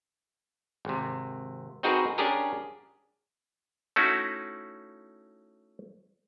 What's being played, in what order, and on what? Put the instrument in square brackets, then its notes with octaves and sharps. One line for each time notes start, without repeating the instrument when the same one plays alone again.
[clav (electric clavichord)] G#1 C3
C4 D#4 F#4 G#4 A#4 B4
C#4 D4 G4 G#4 A#4
A3 C#4 D#4 E4 F#4